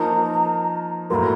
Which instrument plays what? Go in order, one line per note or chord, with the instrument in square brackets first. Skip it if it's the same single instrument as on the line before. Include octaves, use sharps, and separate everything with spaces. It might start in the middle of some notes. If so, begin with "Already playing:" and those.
Already playing: [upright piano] F3 A#3 D#4 [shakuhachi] A#5
[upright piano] A2 F#3 A#3 [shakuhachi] A#5 C6